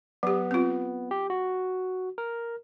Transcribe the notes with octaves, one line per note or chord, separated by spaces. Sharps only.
F#3 B3 G4
C4 F4
G4
F#4
A#4